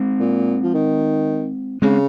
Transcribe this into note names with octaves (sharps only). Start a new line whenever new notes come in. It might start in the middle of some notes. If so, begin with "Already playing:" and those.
Already playing: G#3 C4
A#2
F3
D#3
C#3 G#3 C4